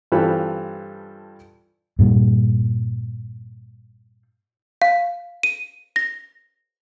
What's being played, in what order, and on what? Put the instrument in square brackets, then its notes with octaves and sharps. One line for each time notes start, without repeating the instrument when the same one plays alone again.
[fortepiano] G2 E3 C4 F4 A4 B5
[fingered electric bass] G2 A#2 G3
[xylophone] F5
D#7
A#6